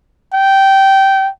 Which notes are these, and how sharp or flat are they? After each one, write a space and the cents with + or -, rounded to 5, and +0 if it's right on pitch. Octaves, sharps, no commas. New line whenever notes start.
G5 -15